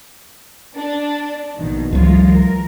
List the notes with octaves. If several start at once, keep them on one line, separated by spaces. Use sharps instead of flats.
D4
A#1 B2 D#3
C#2 E3 F#3 G#3 F4
A#4